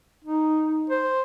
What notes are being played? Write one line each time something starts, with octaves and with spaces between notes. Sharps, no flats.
D#4
C5